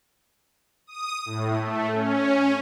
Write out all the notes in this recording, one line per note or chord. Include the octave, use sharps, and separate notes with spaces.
D#6
A2
A3
C#4